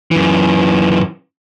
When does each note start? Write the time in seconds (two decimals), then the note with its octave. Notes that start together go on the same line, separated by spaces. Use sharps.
0.11 F#2 E3